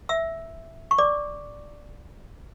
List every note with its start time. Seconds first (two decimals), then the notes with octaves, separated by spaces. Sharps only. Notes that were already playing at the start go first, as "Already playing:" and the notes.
0.09 E5 E6
0.91 C#6
0.98 D5 D6